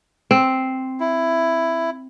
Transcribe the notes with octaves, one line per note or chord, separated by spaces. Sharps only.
C4
E4